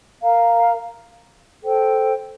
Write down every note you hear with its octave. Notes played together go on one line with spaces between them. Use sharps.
A#4 F5 A#5
A4 C5 G5